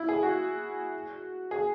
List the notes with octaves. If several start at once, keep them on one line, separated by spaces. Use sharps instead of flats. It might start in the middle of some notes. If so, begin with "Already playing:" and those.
Already playing: E4
G#4
F#4
G#4